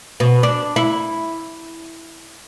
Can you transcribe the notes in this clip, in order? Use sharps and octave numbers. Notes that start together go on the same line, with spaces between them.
B2
D4
E4